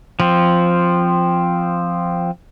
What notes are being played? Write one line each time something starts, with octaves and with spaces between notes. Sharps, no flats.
F3 C4